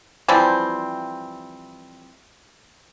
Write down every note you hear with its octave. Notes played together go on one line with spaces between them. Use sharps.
E3 F3 G3 C4